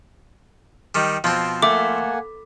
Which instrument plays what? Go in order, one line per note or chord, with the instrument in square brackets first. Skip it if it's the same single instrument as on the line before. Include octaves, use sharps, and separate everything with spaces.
[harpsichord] D#3 G3
[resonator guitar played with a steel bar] B2 [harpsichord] F3 C4
[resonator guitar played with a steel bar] A3 [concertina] A#3 F#5 G#5 [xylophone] D6